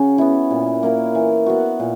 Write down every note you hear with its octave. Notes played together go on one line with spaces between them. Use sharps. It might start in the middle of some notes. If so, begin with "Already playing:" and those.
Already playing: C#3 C#4 F#4
B3 E4
A#2
A#3 E4 A#4
E3
B3 F#4
A#2